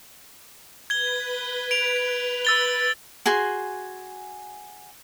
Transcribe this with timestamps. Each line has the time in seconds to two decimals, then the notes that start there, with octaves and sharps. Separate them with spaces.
0.90 B4 G#6 G7
1.71 D7 F7
2.45 E6 A6 G7
3.26 F#4 G#4 G#5 C6